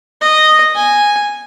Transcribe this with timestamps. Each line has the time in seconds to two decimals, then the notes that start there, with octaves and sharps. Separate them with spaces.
0.21 D#5
0.75 G#5